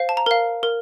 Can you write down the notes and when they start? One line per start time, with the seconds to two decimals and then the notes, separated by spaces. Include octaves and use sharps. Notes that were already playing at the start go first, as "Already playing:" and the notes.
Already playing: C5 F5
0.09 A5
0.17 A#5
0.26 A#4 F5
0.63 A#4